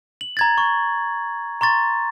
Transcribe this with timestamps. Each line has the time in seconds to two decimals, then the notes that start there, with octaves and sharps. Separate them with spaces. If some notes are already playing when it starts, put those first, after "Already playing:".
0.21 F#7
0.37 A#5 G#6 A6
0.58 C#6
1.61 A#5 C6 C#6 A6